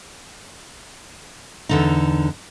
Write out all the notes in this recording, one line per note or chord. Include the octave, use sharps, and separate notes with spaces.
E2 D3 D#4